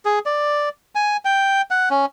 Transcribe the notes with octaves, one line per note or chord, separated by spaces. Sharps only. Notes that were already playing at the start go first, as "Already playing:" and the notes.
G#4
D5
G#5
G5
F#5
C#4